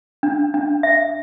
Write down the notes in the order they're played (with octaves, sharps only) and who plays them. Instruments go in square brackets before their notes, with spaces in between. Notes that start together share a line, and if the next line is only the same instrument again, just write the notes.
[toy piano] D4
D4
E5